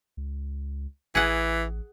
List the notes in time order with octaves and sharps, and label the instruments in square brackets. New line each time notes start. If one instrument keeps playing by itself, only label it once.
[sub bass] C#2
[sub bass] A1 [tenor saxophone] E3 [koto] G#4 F#5